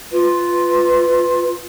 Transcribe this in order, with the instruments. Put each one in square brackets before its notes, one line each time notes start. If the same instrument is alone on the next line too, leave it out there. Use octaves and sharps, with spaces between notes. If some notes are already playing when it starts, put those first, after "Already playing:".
[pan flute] F4 [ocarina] B4